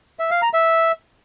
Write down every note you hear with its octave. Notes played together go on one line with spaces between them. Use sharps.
E5
F5
A#5
E5